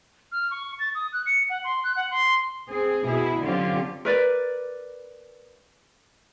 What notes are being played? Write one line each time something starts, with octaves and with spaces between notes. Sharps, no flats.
F6
C#6
A6
D#6
F#6
C#7
F#5
C6
F#6
F#5
C6
C4 G#4
B2 E4 G#4
D3 F#3 C4 C#4 F4 G4
A#4 B4 D5